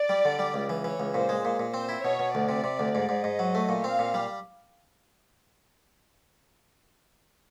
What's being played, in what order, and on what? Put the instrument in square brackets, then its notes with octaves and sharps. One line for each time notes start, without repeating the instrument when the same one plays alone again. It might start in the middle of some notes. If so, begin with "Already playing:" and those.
Already playing: [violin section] D5
[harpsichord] G3
D3
G3
C#2
E3
[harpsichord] E3 [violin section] C#5
[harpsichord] C#2
[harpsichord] A#2 [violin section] C5
[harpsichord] G#3
A#2
A#2
[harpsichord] C4 [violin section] C5
[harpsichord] E4
[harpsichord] B2 [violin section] C#5
[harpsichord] B2
[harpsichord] D2 [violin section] D5
[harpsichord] C3
C3
D2
G#2
G#2
[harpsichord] G#2 [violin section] D#5
[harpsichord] F#3
A3
A#2
[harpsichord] C4 [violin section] F5
[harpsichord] A#2
G3